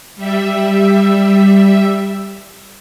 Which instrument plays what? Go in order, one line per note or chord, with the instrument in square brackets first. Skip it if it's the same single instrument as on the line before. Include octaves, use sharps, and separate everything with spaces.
[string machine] G3 E5